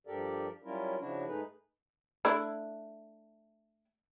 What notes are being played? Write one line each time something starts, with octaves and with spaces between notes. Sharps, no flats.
G2 F3 G4 A4 A#4 D5
F#3 G3 C#4 E4 F4 A#4
C#3 F3 D4 E4 F#4
G#2 A3 D#4 G#4 B4
A3 D4 E4